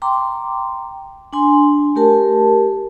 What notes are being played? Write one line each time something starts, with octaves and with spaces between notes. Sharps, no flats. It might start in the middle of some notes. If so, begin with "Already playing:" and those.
G5 A#5 C6 D6
D4 G#5 C6
A3 G4 A#4 A5